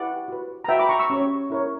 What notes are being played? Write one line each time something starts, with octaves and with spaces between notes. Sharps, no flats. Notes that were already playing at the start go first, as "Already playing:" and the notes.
Already playing: E4 G4 B4 D5 F#5
F#4 B4
A#5
F#4 B4 E5 G5
B5 D6
A#5 C#6
C#6 E6
C#4 G4 C#5
E4 A#4 C#5